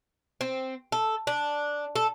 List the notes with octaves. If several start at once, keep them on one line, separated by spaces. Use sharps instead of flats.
C4
A4
D4
A4